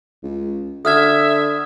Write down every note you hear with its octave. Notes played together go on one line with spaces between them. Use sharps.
C#2
D3 E5 D#6 F6 G#6